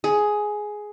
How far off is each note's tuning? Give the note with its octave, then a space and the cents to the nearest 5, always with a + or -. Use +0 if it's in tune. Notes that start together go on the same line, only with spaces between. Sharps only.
G#4 +10